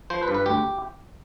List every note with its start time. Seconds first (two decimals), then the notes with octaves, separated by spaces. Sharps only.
0.10 F3 C5
0.23 B4
0.28 G2
0.34 B4
0.46 D2 G4